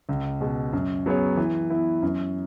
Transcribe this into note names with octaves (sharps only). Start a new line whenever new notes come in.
C#2
B2 G#3
F#2
F#3 B3 G#4 C#5
E3
B3 E4
F#2